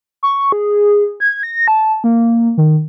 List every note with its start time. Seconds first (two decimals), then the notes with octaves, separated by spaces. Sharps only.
0.23 C#6
0.52 G#4
1.20 G#6
1.43 A#6
1.68 A5
2.04 A#3
2.58 D#3